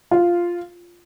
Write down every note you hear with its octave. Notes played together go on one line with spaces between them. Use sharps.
F4